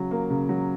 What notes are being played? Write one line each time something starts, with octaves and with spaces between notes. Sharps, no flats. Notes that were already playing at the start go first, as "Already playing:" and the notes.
Already playing: C#3 F#3
A#3
C#3
F#3